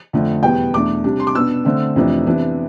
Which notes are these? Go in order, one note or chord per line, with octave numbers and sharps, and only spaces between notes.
F2 D3 A3
E2 B2 G3 B3 G5
E2 B2 A3 D4 D6
C3 G3 D4
C6
D6
B2 B3 D4 E6
D3 A3 C4
F2 C3 E3 A3 D4
C3 E3 B3 D4